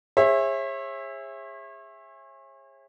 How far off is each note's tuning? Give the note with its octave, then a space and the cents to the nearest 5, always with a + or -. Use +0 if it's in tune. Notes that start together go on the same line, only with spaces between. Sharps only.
G#4 -25 C#5 -40 E5 +0